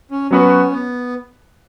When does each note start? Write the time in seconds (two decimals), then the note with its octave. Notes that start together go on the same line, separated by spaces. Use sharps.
0.11 C#4
0.31 F#3 B3 C#4 F#4 B4
0.72 B3